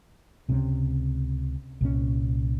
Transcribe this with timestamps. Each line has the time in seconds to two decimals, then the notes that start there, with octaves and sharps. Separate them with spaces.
0.49 C#2 C3 F#3 C#4
1.81 C2 A#2 F#3 C#4